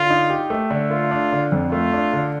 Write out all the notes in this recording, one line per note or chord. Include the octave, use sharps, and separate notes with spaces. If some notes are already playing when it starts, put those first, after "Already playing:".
Already playing: D3 F4
D#4
G4
A3
D3
A3 F4
D4
D3
F2
A3 F4
D4
D3